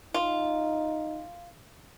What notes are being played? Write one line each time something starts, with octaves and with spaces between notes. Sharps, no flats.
D#4 F4